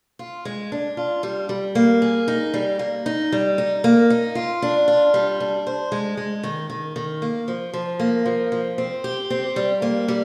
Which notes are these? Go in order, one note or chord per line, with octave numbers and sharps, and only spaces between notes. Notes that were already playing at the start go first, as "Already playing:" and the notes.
F4
G#3
D4
F4
G3
G3
A#3
G#4
D#4
G3
A#3
D#4
G3
D#4
A#3
D#4
F4
D4
F4
G3
D4
C5
G#3
G#3
D#3
D#3
D#3
A#3
F3
F3
A#3
F3
F3
C4
G4
C4
G3
A#3
G3